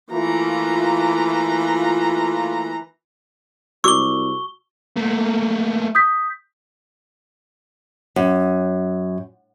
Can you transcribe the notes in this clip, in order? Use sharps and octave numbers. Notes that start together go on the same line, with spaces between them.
E3 A3 A#3 F4 A#5
C2 F#4 C#6 D6 E6 G7
A3 A#3
D#6 G6 B6
F#2